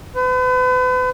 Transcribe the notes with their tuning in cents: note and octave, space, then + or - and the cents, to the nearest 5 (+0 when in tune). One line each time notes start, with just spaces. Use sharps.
B4 +40